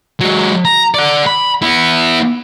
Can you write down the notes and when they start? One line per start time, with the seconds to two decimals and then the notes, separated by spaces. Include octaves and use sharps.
0.20 F#3 G#3
0.65 A#5
0.94 D5 F#5
1.26 B5
1.62 B3 E4